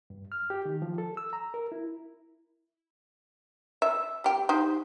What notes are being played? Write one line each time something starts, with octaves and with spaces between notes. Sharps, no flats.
G2
F6
G4
D#3
F3
A4
E6
A#5
A#4
E4
E5
G3 G4
D#4 G4 C5